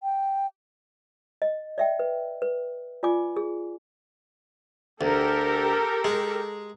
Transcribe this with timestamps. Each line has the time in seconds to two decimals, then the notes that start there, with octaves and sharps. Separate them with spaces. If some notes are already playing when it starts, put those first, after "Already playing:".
0.03 G5
1.42 D#5
1.78 D5 E5 G5
1.99 B4
2.42 B4
3.03 F4 D5 G#5 D6
3.37 G#4
5.01 D2 G4 A4 A#4
6.05 G#3